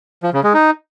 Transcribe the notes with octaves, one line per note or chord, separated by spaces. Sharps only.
F3
C#3
G#3
D#4